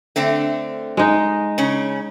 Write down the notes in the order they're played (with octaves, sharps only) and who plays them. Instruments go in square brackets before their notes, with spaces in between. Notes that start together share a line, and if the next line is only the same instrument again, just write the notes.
[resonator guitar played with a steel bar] D3 A3 C4
[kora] G#3 D#4
[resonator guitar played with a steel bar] C#3 C#4